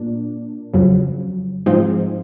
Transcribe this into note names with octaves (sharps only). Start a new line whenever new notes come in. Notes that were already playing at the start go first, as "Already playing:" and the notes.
Already playing: A#2 A#3 D4
F2 C#3 F#3
G#2 F3 G#3 C4 D#4